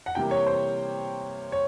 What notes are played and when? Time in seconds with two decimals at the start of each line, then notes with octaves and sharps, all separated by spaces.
0.06 F#5
0.15 C3 E3 G3 A#3 G5
0.31 C#5
0.46 C5
1.52 C#5